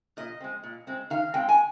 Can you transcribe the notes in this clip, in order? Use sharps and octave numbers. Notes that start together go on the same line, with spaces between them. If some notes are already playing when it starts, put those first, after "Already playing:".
A#2 D#5
G#3 C4
A#2
G#3 C4
D#3 F5
G#3 C4 G5
G#5